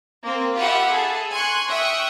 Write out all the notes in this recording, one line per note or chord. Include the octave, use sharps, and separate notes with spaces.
A#3 C4
F4 G4 E5 F#5 B5
G#4 A4
G#5 C6 C#6 F#6
E5 G5 C#6 D#6 F#6